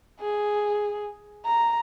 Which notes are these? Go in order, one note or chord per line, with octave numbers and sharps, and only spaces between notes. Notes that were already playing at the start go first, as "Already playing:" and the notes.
G#4
A#5